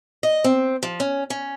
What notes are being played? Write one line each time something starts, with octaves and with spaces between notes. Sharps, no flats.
D#5
C4
F3
C#4
C#4